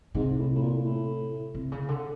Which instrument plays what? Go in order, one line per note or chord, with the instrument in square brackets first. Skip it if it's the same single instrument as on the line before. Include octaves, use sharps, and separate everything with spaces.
[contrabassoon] G#2 [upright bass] C3
[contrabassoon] A2
A2
A#2
A2
[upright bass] C3
C#3
D3